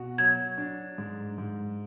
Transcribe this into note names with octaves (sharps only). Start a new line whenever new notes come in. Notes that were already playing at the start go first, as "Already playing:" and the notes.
Already playing: B2 F#4
F#3 G#6
D4
G#2
G#2